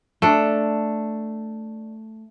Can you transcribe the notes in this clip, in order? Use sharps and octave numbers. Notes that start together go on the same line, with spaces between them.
A3 D4